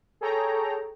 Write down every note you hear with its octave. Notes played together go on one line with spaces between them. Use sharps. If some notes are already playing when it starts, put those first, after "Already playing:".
G#4 A4 C#5 G5 A#5